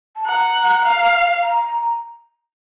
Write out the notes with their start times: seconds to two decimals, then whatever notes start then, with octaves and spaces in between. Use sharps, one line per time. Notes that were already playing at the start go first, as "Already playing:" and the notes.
0.16 A5
0.26 F#5 A#5
0.84 F5
1.43 A#5